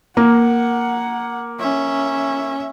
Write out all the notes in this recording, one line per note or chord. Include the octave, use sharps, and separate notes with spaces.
A#3 F#5
C#4 E5